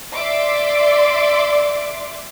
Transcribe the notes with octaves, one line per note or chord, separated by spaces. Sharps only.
D5 E5 C6 D6